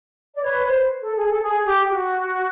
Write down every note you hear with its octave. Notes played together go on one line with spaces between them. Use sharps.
D5
B4 C#5
C5
A4
G#4
A4
G#4
G4
F#4